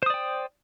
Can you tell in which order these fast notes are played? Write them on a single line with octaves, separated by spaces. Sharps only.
C5 D#6 D5 G5